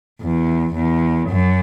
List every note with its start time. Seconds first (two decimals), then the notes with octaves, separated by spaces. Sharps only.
0.21 E2
0.74 E2
1.28 F#2